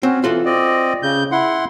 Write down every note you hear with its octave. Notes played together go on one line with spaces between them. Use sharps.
C4 C#4 F#4
E3 F4 F#4 A4
C4 D5 D#5
C#3 G6
E4 F#5 C6